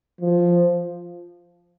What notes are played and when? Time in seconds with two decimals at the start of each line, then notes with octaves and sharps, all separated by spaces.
0.21 F3